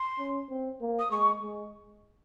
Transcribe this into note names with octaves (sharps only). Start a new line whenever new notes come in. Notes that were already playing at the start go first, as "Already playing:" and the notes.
Already playing: C6
C#4
C4
A#3
D#6
G#3 C#6
G#3